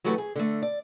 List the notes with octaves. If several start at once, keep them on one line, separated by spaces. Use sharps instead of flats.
E3 F#3 A3 F#4 G4 B4
G#4
D3 A3
D5